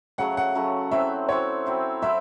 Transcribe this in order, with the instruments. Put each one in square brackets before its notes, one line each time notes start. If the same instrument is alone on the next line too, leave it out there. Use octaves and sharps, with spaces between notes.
[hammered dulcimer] C#3 F#3 A3 [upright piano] F#5
[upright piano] F#5
[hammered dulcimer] C#3 F#3 A3
[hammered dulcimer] F#3 C4 E4 C5 [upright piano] E5
[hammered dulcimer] F#3 C4 E4 C5 [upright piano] C#5
[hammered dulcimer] F#3 C4 E4 C5
[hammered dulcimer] F#3 C4 E4 C5 [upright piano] E5